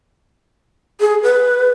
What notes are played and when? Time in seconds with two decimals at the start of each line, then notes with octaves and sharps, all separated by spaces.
1.00 G#4
1.23 B4